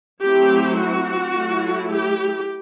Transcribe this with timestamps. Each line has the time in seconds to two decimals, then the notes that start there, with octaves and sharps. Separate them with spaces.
0.23 F#3 A3 C4 E4 G4
0.80 F#4
1.37 F#3 A3 E4
1.94 G4